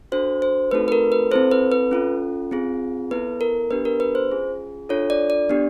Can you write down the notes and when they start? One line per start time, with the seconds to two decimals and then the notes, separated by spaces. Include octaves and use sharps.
0.12 D4 F#4 A4 C5
0.42 C5
0.71 A3 C4 D#4 F#4 A4 B4
0.88 B4
0.92 A#4
1.12 B4
1.31 C4 E4 A4 C5
1.51 B4
1.72 B4
1.91 C#4 F4 A4
2.51 C4 F4 G#4
3.11 B3 E4 A4 B4
3.41 A#4
3.70 B3 D4 G4 B4
3.85 A#4
4.00 B4
4.15 C5
4.30 C#4 F4 G#4
4.89 D4 F4 A4 C#5
5.10 D5
5.30 D5
5.49 B3 D4 G4